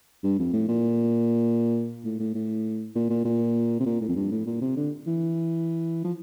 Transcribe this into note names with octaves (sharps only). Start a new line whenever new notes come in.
G2
F2
A2
A#2
A2
A2
A2
A#2
A#2
A#2
C3
A#2
A2
F2
G2
A2
A#2
C3
D3
E3
F3